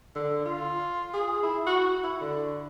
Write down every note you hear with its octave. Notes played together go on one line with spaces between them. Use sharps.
D3
F4
G#4
E4
F#4
E4
D3